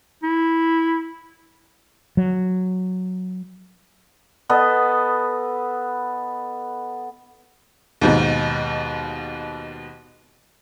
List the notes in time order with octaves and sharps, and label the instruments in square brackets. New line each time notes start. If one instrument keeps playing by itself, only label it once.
[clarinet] E4
[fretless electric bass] F#3
[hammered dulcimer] B3 A4 D#5
[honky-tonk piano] D#2 G#2 B2